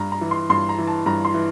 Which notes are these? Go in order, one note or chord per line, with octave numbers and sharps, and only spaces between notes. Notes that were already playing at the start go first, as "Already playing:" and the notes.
Already playing: G2 A#5
A#5
E3
C6
G2 C6
A#5
E3
A5
G2 A#5
C6
E3